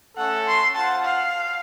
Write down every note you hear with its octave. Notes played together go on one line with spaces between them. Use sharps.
A3 C#4 A4 F#5
C6
F4 C5 F#5 A5
F5